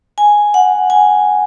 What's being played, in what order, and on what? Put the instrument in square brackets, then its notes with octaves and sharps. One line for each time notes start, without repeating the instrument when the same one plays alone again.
[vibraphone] G#5
F#5
G#5